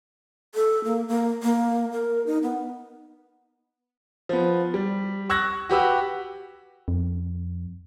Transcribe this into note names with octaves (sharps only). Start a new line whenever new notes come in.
A4
A#3
A#3
A#3
A#4
D#4
B3
F3 B3
G3
C#6 E6 F#6 G#6 A#6
F#4 G4 B4 E6
F2